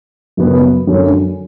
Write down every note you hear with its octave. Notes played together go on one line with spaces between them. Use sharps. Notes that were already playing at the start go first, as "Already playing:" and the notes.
F#2 C#3 F#3 B3
F#2 D3 F#3 C#4